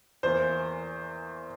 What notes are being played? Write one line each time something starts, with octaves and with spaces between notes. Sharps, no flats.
E2 E3 A#3 C5